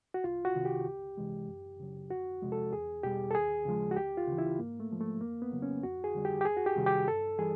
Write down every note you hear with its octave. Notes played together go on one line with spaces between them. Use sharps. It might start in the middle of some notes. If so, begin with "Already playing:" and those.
F#4
C2 F4
F#4
C3 D#3
G4
C#2
C3 E3 G#3
F#2
C#3 F#3
F2 F#4
C3 F3 G#3
A4
E2 G#4
B2 G3 G4
A4
D#2 G#4
C#3 F3 G#3
F#4
D2 G4
F4
C#3 E3
E4
G#2 A#3
A3
F3 G#3
A3
F2 A#3
B3
C#3 F#3
C#4
F2 F#4
G#4
D3 G3
G4
G4
E2 G#4
F#4
G4
C3 D#3 G3
G4
G2 A4
E3 G3 G#4